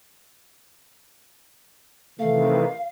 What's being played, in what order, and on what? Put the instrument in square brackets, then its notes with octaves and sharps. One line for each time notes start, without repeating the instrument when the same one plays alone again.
[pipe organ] C3 D#3 E3 [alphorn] A3 [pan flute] F5